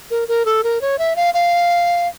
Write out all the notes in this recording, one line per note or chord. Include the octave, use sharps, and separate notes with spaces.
A#4
A#4
A4
A#4
C#5
E5
F5
F5